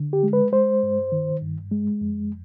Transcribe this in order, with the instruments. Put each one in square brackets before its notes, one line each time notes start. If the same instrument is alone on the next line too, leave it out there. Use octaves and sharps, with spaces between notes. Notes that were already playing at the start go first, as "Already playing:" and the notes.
Already playing: [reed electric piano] D3
G4
G#3
B4
G#3 C5
G2
D#3
G2
G#3
F2